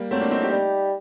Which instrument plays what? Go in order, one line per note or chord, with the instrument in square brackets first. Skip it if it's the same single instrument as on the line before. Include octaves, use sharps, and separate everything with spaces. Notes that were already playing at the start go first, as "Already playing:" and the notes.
Already playing: [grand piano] G3 A#3
[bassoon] F#3 [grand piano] A3 C4
[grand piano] A#3 D4
C4 D#4
D#4 G4
[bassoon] G3